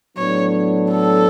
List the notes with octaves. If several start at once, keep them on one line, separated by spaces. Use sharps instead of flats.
A2 F#3 B3 D4 C#5
A4